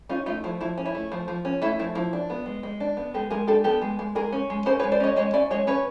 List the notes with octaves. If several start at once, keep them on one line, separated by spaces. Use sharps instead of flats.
C#4 D#4 F4
A3 D#4 F4
F3 E4
F3 E4
C#4
E4
A3
F3
F3
C#4
A3 E4
F3 E4
F3 E4
D4
B3
G#3
G#3
D4
B3
G#3 G4 A4
G#3 G#4 A#4
D4 G4 A4
B3 G4 A4
G#3
G#3
G#3 G#4 A#4
C#4
G#3
C#4 A#4 C5
B4 C#5
G#3
C5 D5
C#4 C#5 D#5
G#3 C#5 D#5
C#4 D5 E5
G#3 C#5 D#5
C#4 B4 C#5